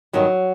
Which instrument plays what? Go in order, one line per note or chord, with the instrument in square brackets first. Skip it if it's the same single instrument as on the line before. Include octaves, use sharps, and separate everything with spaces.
[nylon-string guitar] G2 D#3 F#3